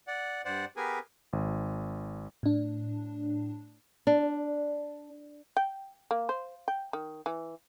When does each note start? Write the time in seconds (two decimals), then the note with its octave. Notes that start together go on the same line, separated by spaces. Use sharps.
0.07 D5 F#5
0.45 G2 C5 D5 F#5
0.77 B3 G4 G#4 A#4 B4 G#5
1.33 G#1
2.43 A2 D4
4.07 D4
5.57 G5
6.11 A#3
6.29 C5
6.68 G5
6.93 D#3
7.26 E3